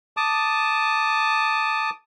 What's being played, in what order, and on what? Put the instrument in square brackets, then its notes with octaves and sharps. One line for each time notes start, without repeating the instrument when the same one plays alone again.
[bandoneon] A5 D6 D#6